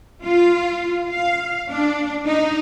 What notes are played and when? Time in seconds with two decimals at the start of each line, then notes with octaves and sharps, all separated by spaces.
0.24 F4
1.10 F5
1.70 D4
2.27 D#4